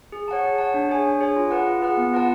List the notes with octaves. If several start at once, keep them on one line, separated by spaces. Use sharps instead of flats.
G#4
C#5 F#5 A5
G#4
C#5 F#5 A5
D4
G#4 C#5 G#5
D4
G#4 C#5 G#5
F4
G#4 B4 F#5
F4
G#4 B4 F#5
B3
F4 B4 F#5 A5